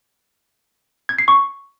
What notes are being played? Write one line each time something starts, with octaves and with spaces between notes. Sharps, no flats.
G#6
C7
C#6